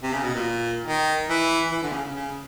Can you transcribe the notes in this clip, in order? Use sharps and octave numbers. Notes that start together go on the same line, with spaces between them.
C3
C#3
B2
A#2
D#3
E3
E3
D3
C#3
C#3
C#3